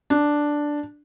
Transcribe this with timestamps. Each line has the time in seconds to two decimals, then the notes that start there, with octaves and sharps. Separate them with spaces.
0.10 D4